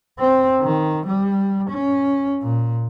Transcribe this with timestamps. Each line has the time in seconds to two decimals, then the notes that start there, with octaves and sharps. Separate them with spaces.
0.19 C4
0.61 D#3
1.07 G3
1.70 C#4
2.42 A#2